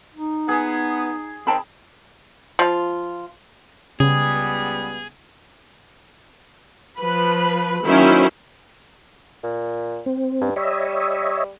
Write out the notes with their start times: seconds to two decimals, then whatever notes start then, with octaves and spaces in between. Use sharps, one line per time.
0.14 D#4
0.48 B3 G#4
1.47 D#3 C4 G5 A5 B5
2.59 F3 F4
4.00 C#2 C#3 G3 B3 G#4
6.99 F3 B4 B5
7.84 D#3 F#3 A#3 C#4 E4 C5
9.44 A#2
10.06 C4
10.41 G2
10.56 G3 C#5 D#5 E5